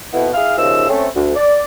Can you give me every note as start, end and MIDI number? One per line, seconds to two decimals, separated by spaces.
0.14 0.28 41
0.14 0.28 47
0.14 0.28 59
0.14 0.28 64
0.34 0.53 64
0.34 0.53 68
0.34 0.53 77
0.34 0.53 89
0.58 0.88 39
0.58 0.88 49
0.58 0.88 53
0.58 0.88 63
0.58 0.88 76
0.58 0.88 88
0.90 1.08 57
0.90 1.08 60
0.90 1.08 61
1.15 1.32 38
1.36 1.64 74